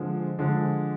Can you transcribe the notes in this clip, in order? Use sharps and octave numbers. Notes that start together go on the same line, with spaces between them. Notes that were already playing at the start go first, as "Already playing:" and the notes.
Already playing: D3 F3 G#3
D3 F3 G#3